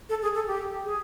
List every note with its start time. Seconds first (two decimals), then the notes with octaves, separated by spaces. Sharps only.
0.09 A4
0.22 G#4
0.35 A4
0.47 G4
0.84 G#4